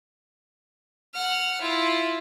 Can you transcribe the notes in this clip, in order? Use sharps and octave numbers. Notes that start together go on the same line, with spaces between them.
F#5 F6
E4 F4